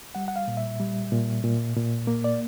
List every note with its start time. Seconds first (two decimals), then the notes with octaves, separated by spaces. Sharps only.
0.15 G3 F#5
0.28 F#5
0.36 F5
0.48 A#2
0.57 E5
0.80 G3
1.12 A#2
1.44 A#2
1.76 A#2
2.07 A#3
2.24 D5